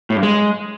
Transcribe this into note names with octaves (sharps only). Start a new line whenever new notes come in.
A2
G2
G#3